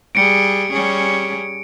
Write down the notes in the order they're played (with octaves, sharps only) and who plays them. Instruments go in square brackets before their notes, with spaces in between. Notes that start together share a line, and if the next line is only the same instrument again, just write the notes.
[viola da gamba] G3 G#4 [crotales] C#7 D7
[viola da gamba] G3 C#4 G#4